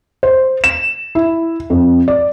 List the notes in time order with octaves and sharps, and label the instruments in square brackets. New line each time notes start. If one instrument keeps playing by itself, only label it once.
[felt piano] C5
E7
E4
F2
D5